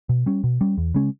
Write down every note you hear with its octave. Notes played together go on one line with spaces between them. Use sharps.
B2
G3 C#4
B2
G3 C#4
E2
C#3 G#3 C#4